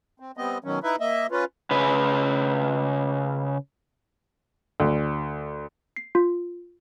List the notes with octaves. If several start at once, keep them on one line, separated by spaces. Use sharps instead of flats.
C4
G3 B3 C4 D#5
B2 D#3 F#3 C#4
D#4 E4 B4 E5
A#3 D#5 E5
C#4 F4 B4
C#3 B4
D2
C7
F4